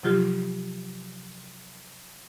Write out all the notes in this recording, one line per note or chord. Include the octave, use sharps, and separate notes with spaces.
C3 F3 F#3 F4 G4